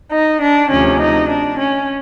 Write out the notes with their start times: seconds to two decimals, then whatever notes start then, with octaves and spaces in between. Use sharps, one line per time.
0.13 D#4
0.42 D4
0.71 D2 C3 F3 C#4
1.01 D#4
1.30 D4
1.59 C#4